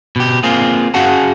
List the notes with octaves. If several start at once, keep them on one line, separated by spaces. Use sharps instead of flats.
B2 G4
A#3 C4 F4 G#4
C#4 F#4 G#4 F5 F#5 A5